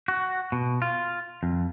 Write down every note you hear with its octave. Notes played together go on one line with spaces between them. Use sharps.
F#4
B2
F4
F2